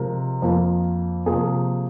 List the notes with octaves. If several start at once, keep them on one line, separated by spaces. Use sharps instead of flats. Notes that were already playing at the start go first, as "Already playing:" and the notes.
Already playing: C3 F3 G#3 C4 A#4
F2 F3 A#3
C3 F3 A#3 G#4